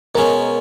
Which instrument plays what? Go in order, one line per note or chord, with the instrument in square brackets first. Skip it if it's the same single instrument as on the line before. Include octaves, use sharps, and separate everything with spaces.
[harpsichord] B2 G#3 C#4 [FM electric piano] A#4